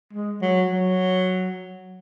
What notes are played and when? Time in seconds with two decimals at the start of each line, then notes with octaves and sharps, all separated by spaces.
0.13 G#3
0.41 F#3
0.70 F#3